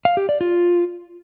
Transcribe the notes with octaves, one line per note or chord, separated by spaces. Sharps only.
F5
G4
D5
F4